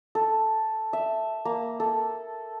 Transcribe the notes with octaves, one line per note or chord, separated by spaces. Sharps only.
A4
E5
A#3
A4